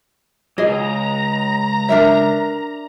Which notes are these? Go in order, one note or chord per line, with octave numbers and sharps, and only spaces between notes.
C#2 G#2 G#4 D#5 A#5
D4 A#4 E5